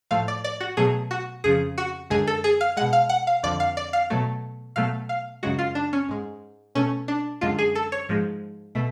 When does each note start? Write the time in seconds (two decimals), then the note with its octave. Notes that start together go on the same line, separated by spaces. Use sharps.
0.11 A2 F3 A3 F5
0.28 D5
0.44 D5
0.60 F#4
0.77 B2 F#3 A3 G#4
1.11 F#4
1.44 F2 C#3 F3 G#4
1.78 F#4
2.10 F#2 D3 G#3 G#4
2.27 A4
2.44 G#4
2.61 F5
2.77 B2 G#3 F#5
2.93 F5
3.09 F#5
3.27 F5
3.43 F2 D3 F3 D5
3.60 F5
3.77 D5
3.93 F5
4.10 B2 F#3 A3
4.76 B2 F#3 A3 F5
5.09 F5
5.43 F#2 C#3 G#3 F#4
5.59 F4
5.75 D4
5.93 C#4
6.09 G#2 G#3
6.75 B2 A3 C#4
7.08 D4
7.41 F#2 D3 G#3 F4
7.59 G#4
7.75 A4
7.92 C#5
8.09 G#2 F3 G#3
8.75 B2 A3